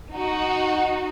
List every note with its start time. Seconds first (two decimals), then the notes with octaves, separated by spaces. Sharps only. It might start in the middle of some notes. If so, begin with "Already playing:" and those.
0.13 D#4 F#4